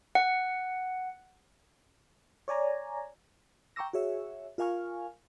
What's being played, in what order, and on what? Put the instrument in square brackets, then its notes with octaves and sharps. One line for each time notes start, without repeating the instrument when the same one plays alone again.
[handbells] F#5
[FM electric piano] C#5 D5 G#5 A#5
G5 A#5 C#6 D6 E6 A#6
F#4 G#4 C#5 E5
F4 A#4 F5 G#5 C#6 F6